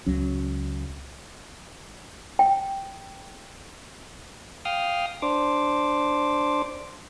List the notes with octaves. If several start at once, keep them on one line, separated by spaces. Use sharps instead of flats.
C#2 F#3 C#4
G5
F5 G5 D#6 F6
D4 C5 D6